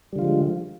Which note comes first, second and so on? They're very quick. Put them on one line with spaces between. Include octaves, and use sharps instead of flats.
G3 D3 F4 F3 G#3